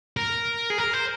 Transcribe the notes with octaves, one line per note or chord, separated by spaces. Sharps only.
A#4
G#4
A#4
C5